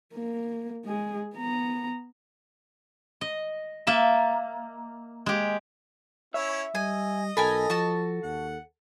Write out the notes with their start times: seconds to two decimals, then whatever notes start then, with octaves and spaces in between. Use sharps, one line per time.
0.14 A#3
0.85 G#3 G#4
1.36 B3 A#5
3.21 D#5
3.87 A#3 E5 A5
5.26 G#3 G4
6.34 C#4 E4 C#5 E5
6.75 G3 D#5 G#5
7.37 B1 A4 A#4 G#5 B5
7.70 F3 F#4 A5
8.23 D#2 F#5